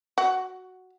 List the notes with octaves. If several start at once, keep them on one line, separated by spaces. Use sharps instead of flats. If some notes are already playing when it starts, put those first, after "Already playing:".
F#4